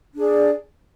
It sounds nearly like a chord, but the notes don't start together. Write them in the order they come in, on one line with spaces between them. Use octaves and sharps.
D4 G#4 D5